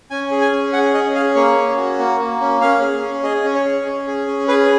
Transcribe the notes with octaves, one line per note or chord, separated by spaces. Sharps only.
C#4 G#5
G#4
G#5
C#4
G#4 F#5
C#4 D#5
G#4 F5
A#3 C#5
C#4
F#4
A#3
A#3
C#4
C#4 F5
G#4
C#4
G#4 D#5
C#4
C#5
G#4
C#4
G#4
C#4
G#4 B4